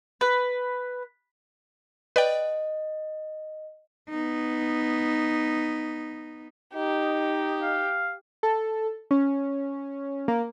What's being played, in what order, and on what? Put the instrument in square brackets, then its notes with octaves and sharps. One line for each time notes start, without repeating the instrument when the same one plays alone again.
[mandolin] B4
[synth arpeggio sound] B4 D5 G5 [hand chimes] D#5
[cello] B3 D#4
[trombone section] D#4 [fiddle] G4
[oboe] F5
[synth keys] A4
C#4
A#3